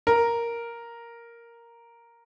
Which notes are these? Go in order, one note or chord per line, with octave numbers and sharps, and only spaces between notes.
A#4